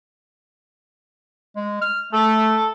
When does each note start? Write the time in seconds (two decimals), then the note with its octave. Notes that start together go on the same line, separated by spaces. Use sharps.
1.56 G#3
1.81 F6
2.13 A3 A4